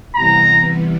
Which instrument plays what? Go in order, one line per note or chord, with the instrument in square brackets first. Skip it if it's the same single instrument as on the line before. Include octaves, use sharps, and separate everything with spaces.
[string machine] C3 E3 G3 B3 [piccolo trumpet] A#5